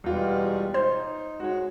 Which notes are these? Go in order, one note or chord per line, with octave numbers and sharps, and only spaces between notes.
E2 B2 G3 G#3 F4
D#4 C5 C6
G#3 F#4 C#5